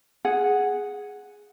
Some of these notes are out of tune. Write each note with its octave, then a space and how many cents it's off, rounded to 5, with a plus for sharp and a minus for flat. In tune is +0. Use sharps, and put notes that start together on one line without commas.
G#4 +0 F#5 +0